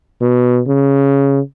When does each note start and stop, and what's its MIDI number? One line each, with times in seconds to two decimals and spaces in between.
0.21 0.60 47
0.67 1.40 49